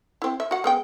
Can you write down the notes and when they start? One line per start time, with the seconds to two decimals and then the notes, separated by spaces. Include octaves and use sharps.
0.22 C4 E4
0.40 E5
0.51 F#4 F#5
0.64 G#3 B3 G5